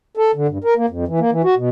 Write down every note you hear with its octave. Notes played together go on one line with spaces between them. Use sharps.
A4
D3
G2
A#4
A#3
F2
E3
A#3
E3
F#4
B2